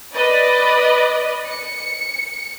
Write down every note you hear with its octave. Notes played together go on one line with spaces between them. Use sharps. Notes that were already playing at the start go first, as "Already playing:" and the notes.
B4 D5 D#5
C#7